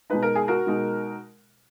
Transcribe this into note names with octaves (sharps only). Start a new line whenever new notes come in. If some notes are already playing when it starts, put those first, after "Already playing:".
B2 G#3 D#4 B4
A#4
G#4
F#4 A#4
B2 G#3 D#4